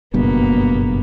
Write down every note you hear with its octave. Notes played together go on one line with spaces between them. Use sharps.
F#1 G2 B2 A#3 B3